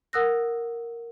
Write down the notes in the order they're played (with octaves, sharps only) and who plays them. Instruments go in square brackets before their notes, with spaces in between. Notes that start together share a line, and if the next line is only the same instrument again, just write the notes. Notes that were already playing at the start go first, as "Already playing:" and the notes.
[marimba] A#4 F#5 D#6 E6 F#6 A#6